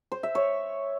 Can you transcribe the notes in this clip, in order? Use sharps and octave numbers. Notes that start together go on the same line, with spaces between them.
C5
E5
C#5